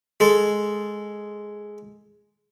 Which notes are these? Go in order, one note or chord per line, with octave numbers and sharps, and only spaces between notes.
G#3 A4